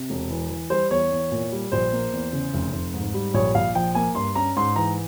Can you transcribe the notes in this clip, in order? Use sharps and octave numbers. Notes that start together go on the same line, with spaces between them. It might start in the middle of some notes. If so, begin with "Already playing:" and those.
Already playing: C3
E1
E3
E3
G3 C5
E2 C#5
E2
A#2
G3
A#1 C5
A#3
E2
C#3
F1
F1
G#2
G3
A#1 C#5
A#1 F5
F3 G5
A#3 G#5
G2 C6
C#4 A#5
G#2 C6
E3 A#5